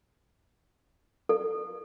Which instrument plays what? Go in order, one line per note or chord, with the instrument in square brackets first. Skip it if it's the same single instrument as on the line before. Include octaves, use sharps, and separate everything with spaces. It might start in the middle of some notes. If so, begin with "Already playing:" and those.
[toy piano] A4